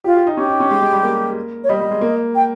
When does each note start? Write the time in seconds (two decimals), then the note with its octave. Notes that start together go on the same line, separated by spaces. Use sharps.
0.04 F4 G4
0.16 G4
0.27 D#4
0.37 C#4 G4
0.48 D#4
0.60 C#4
0.71 G#3
0.82 G#3
0.93 G3
1.03 A#3
1.64 C#5
1.69 G3 D#5
1.80 G3
1.91 G#3
2.01 A#3
2.35 G5